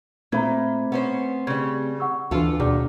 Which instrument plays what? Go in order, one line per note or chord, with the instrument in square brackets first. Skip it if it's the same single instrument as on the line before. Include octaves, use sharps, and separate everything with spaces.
[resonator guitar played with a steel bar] A#2 [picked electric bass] A3 C4 [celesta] A#5 B5 G#6
[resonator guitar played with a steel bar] B3 C#4 C5
[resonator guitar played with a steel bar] C#3 G3 [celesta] G#6
[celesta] F#5 C#6 E6
[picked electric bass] D2 E3 [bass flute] D4 [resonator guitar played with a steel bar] F4 A4 [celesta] F#4
[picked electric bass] D#2 B2 [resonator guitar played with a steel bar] D#3 [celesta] G#4 D5 D6